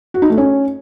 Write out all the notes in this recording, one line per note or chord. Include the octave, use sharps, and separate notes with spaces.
F#4
D#4
A3
C#4